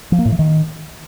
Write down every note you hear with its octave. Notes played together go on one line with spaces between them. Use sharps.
F3
A#3
A2
E3
D#3